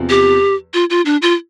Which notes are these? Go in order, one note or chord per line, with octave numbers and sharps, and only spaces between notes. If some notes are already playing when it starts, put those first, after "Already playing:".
Already playing: E2 C3 F3
G4
F4
F4
D4
F4